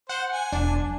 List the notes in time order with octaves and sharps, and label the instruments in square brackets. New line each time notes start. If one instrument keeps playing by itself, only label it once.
[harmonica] C5 [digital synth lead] F#5
[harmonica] G#5
[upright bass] E1 [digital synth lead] D4
[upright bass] F#3